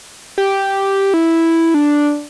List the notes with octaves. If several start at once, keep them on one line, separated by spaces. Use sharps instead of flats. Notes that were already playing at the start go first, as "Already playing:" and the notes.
G4
E4
D4